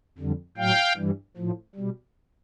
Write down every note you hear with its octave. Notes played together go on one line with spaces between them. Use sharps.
F2 D3 G3
A2 F#3 F5 G5
G2 E3 G3
A2 F3
B2 G3